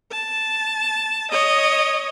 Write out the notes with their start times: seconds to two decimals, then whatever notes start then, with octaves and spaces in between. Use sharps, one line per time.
0.11 A5
1.31 C#5 D#5